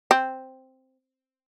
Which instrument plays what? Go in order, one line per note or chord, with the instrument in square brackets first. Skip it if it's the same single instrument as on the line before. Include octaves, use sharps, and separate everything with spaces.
[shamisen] C4